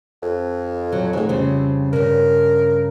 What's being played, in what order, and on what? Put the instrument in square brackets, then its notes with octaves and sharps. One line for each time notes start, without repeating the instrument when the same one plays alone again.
[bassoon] F2
[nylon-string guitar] F#3
[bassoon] G#2 [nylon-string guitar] E3 A3
[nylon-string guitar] F2 C#3 G3 [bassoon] C4
[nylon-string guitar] G2 C#3 [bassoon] A#4